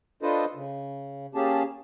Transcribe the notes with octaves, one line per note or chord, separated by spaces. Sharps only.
D4 F4 A4 B4 C5 D#5
C#3
A#3 C#4 G4 G#4 A5